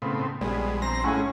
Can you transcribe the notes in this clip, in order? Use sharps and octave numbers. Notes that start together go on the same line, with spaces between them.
A2 C#3 B3 C4
A#1 G3 G#3 B3
C4 C5 A#5 A#6
A2 G#3 C#4 E4 F#5 G#5